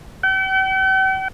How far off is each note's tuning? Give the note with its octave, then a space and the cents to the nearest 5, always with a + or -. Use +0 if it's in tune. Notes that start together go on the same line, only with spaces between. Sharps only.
G5 -45